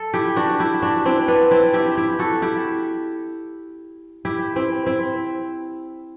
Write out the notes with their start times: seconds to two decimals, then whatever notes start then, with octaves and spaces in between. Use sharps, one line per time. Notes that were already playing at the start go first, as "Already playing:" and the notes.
Already playing: A4
0.14 E4 G4
0.36 D4 F#4
0.60 E4 G4
0.82 D4 F#4
1.06 C4 E4
1.28 B3 D4
1.51 C4 E4
1.73 E4 G4
1.97 E4 G4
2.19 F#4 A4
2.42 E4 G4
4.25 E4 G4
4.56 C4 E4
4.86 C4 E4